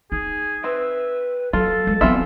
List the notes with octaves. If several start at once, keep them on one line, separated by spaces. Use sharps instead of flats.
D#4 G#4
C4 B4 E5
F#3 F4 A4 A5
G#3
E3 F#3 B3 C4 F4 E5